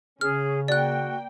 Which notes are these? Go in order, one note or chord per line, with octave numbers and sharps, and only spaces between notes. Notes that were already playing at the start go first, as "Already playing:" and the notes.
C#3 C#4 G#4 F6
A#3 F#4 D5 G5 F#6